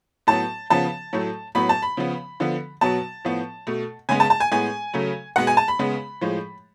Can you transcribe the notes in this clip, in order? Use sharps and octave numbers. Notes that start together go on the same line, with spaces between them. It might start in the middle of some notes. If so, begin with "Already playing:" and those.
A2 F#3 B3 A5
C#3 F3 B3 A5
A2 F#3 A3
A2 F#3 B3 B5
A5
B5
C#3 F3 B3
D3 F3 B3
B2 F#3 B3 A5
A2 F3 B3
B2 A3
C#3 G#3 B3 G#5
A5
A5
G#5
A2 G#3 B3 G#5
C#3 F#3 A3
B2 G#3 B3 F#5
G#5
A5
B5
C#3 G#3 B3
A2 F3 G#3